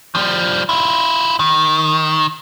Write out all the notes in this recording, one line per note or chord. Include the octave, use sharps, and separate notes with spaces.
F3 G3
E4 F4
D#3